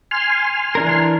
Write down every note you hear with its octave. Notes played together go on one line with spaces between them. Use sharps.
G#5 C6 F6
E3 D4 A#4